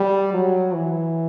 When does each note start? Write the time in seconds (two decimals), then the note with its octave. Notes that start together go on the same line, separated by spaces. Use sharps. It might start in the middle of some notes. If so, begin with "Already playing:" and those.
Already playing: G3
0.34 F#3
0.74 E3